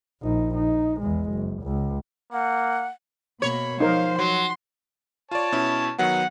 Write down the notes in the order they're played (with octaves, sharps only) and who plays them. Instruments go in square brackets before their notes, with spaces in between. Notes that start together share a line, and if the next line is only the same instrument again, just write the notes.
[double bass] A#1 D#4
D#4
E2 G#3
F#1
C#2
[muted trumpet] A#3 [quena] F#5
[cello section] B2 A#3 [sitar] C#5 [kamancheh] B5
[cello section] F3 [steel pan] D#4 A#4 [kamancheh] C5 F5
[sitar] F#3 [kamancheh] C6
[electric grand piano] F4 D5 [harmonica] C#5 A5
[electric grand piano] B2 C#4 E4
[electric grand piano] D#3 F#3 B3 [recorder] F#5